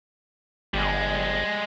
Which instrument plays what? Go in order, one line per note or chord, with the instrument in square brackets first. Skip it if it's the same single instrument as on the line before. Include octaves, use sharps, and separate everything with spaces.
[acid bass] G1 [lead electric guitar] G3 G#3